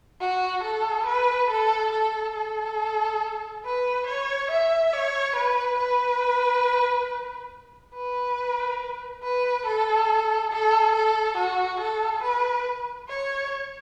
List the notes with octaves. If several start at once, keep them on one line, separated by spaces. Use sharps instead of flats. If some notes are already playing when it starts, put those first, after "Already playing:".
F#4
A4
B4
A4
A4
A4
B4
C#5
E5
C#5
B4
B4
B4
B4
A4
A4
A4
F#4
A4
B4
C#5